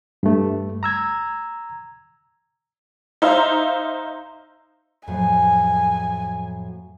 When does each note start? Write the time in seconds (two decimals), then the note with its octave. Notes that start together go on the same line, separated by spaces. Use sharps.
0.23 G2 A3
0.83 A#5 E6 G#6
3.22 D#4 C5 E5 F5 A#5
5.07 F2 A2 F#3 G#5